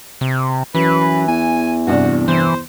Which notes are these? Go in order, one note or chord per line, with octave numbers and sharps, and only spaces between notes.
C3
F#2 E3 B4
E2 G#5
G2 C3 D4 F#4
E3 C5